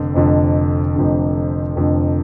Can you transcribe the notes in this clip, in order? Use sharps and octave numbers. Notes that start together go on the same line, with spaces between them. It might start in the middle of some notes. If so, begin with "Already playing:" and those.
Already playing: F1 F2 D3
F1 F2 D3
F1 F2 D3
F1 F2 D3